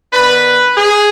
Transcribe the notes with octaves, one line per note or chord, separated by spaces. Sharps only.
D#3 B3 D4 B4
G#4